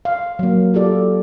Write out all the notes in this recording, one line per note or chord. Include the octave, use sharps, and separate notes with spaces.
F5
F#3 A#3
F4 G4 A4 D5